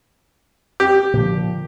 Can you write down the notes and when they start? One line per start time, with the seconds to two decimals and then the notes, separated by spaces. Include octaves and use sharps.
0.80 G4
1.14 A#2 D3 F3